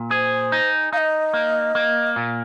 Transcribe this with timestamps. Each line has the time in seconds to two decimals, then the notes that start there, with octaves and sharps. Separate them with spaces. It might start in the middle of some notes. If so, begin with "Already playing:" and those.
Already playing: A#2
0.11 G#4 C5
0.52 D#4
0.93 D#4 F5
0.98 D#5
1.34 A#3
1.75 A#3
2.16 A#2